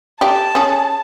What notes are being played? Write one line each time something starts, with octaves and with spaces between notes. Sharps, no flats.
G4 D5 A5
C#4 G#4